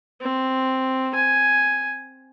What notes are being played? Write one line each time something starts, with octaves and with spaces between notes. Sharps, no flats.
C4
G#5